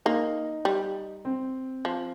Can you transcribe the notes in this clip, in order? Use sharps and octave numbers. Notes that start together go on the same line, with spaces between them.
A#3 D#4
G3
C4
F3